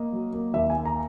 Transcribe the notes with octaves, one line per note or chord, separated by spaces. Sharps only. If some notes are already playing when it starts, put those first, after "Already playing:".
Already playing: A#3 D#5
F#3
A#3
D#2 E5
G#5
A#3
A#5